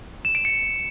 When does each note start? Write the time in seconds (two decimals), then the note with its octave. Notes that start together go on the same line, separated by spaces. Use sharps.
0.25 E7
0.35 D7
0.45 C#7